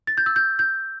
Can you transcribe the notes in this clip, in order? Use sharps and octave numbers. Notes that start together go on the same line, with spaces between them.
A6
G6
E6
G6
G6